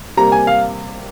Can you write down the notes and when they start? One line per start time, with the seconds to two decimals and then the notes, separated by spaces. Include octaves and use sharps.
0.17 C3 G3 A#3 A#5
0.32 G#5
0.47 F5